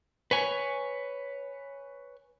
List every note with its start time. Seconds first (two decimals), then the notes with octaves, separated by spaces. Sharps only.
0.31 B4 C#5 G#5